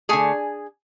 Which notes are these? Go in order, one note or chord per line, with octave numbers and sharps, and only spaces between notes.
D3 A3 G#4 G#5